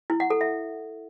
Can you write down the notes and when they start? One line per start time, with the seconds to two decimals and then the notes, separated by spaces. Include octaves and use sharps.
0.10 E4
0.20 F#5
0.30 A4
0.41 E5